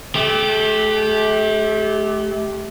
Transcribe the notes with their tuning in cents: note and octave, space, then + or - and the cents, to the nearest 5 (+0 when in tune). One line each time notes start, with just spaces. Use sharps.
A3 -35 G4 +0